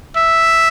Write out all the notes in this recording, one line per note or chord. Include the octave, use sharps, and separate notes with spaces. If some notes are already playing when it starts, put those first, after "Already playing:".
E5